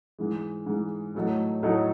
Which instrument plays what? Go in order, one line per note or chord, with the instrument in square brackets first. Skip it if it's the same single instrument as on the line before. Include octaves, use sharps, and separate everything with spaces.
[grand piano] G#2 E3 G#3
G#2 E3 G#3
A2 F#3 A3 D#4
A2 F#3 A3 D#4